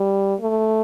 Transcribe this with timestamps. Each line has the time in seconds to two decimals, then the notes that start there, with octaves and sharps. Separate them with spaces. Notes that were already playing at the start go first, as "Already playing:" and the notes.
Already playing: G3
0.41 A3